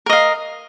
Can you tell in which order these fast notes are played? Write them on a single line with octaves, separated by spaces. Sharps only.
A#4 D#5 F5